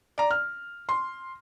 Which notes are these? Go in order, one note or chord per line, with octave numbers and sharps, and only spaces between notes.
D5 A#5
F6
C6